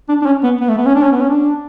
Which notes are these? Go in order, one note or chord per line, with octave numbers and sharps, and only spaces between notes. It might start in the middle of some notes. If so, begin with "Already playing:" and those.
D4
D4
C#4
B3
B3
A3
B3
C#4
D4
C#4
B3
C#4
D4